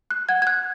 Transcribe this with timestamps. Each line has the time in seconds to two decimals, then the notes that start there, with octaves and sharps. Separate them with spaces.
0.10 F#6
0.29 F#5 G#6
0.42 G#6
0.47 F#6